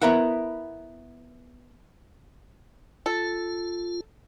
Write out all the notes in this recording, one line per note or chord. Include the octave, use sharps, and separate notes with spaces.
B3 E4 A#4 E5 F#5
F4 A4